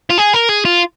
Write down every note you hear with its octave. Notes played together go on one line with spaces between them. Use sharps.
F4
G#4
A#4
G#4
F4